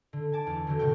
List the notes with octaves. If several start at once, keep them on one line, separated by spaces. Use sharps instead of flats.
D3
G#5 A5 D6
E2
D3 F#3 A3
A2 C3 D#3 C4 G5 G6